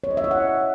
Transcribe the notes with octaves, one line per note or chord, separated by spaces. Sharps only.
C#5
D#5
E5
C#5
F#5